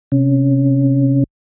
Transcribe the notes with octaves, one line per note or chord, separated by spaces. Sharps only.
C3 C#4